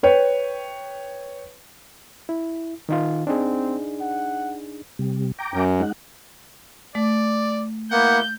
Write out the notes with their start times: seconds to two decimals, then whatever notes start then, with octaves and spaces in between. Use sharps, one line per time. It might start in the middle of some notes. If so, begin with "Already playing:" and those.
0.03 B4 C#5 G5
2.29 E4
2.89 D#3 D#4 F4
3.27 C4 D4 D#4 G#4
4.00 F#5
4.99 C3 G3
5.39 G5 A#5 D6
5.54 F#2
5.80 G#3 D#4 F#5
6.95 A3 D5
7.92 A#3 B3 E4 F#5 G6